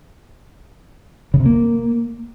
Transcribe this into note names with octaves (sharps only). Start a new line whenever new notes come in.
C#3
C3
A#3